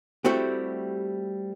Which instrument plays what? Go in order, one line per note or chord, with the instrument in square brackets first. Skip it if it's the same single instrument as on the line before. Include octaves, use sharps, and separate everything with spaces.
[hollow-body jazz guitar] G3 A3 C4 E4 F#4 G4